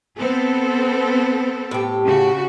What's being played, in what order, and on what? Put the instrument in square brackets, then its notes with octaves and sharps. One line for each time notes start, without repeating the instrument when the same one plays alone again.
[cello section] B3 C4 A4
[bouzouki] A2 G4
[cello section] C#3 F#4